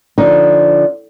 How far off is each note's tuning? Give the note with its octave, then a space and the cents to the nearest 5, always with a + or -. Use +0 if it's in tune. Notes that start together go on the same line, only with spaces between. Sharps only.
D3 -10 F3 +0 D#4 +0